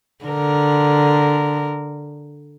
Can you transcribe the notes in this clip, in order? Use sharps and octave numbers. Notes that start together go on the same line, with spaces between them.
D3 A#4